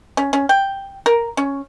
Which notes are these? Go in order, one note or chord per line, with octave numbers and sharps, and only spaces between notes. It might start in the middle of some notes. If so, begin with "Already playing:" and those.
C#4
C#4
G5
A#4
C#4